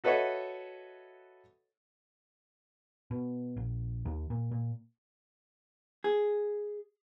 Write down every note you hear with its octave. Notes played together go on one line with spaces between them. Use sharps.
F#4 A4 B4 C#5 D#5 E5
B2
A#1
D#2
A#2
A#2
G#4